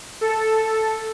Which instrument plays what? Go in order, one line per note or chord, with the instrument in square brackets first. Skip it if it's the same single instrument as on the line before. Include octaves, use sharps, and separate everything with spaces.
[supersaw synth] A4